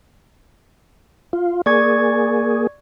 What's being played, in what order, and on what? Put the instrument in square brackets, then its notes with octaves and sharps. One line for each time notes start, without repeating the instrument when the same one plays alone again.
[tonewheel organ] F4
[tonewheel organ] A#3 G#4 [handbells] D5 C#6 G#6